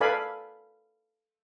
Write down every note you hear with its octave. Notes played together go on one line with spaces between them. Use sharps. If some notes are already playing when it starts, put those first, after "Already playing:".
A4 B4 D5 F5 G#5 B5